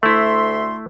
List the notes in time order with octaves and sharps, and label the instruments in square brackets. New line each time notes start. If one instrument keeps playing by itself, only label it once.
[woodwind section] D2 E5 C6 [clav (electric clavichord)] A3 E4